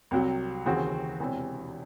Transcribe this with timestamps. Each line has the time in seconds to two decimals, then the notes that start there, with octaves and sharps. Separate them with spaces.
0.11 C2 C3 F#3
0.66 D#2 C#3 E3 C4 F#4
1.20 E1 E2 C3 E3